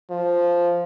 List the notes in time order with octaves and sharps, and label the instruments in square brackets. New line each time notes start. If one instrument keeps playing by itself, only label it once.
[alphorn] F3